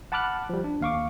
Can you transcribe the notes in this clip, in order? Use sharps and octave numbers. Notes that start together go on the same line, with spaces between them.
F#5 A5 B5 D6 F6 F#6
F3 G3
D4
D#2 F5 C#6 D6